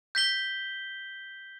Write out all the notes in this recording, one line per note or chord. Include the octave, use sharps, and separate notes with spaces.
G6 B6 G7